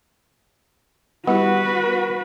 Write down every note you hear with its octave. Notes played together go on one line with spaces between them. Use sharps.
G3 B3 E4 F#4 G4 B4